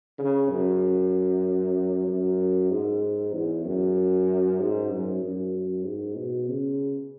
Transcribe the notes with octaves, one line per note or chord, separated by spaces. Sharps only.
C#3
F#2
F#2
G#2
E2
F#2
G#2
F#2
F#2
G#2
B2
C#3